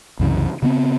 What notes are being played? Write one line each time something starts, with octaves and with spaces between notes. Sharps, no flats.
C2 F#2 C#3 E3
C#3 B3 C4